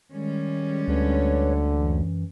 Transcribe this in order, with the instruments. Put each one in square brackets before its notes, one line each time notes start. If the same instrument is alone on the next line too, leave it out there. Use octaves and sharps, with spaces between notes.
[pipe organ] D#3 [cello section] G3 G#3 C#4
[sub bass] D2 [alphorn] D3 [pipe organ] B4 C#5
[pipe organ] F#2 E3